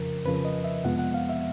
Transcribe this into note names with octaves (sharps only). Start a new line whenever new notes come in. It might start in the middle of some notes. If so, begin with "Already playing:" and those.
Already playing: F2 C#3 F3 A#4
F2 C#3 F3 B4
D#5
E5
F2 C3 F3 G#3 B3 F#5
F#5
F5
E5